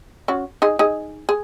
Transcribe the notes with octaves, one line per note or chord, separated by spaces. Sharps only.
C#4 F#4
D#4 G#4
D#4 G#4
G#4